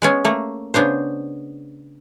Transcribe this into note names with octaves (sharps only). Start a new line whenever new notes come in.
G#3 B3 C#4
A3 A#3
C#3 B3 D4 C5